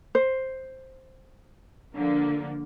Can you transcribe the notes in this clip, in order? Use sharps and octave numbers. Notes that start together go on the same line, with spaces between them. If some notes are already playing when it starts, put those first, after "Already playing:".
C5
D3 F3 A#3